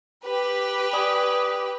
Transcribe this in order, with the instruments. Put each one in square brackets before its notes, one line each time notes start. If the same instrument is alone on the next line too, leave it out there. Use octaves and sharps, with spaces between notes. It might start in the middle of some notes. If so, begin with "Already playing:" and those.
[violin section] G4 B4
[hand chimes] D5 G#5 D#6